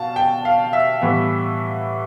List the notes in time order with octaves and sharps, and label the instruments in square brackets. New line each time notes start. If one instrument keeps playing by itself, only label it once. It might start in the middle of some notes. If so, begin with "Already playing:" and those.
Already playing: [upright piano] B2 F5 A5
G5
F5
E5
A2 E3 G3 B3